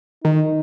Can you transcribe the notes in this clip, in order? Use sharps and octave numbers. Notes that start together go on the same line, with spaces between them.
D#3 D#4